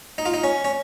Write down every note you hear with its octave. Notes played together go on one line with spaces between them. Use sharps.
D#4
F4
D#4
C#4
C#4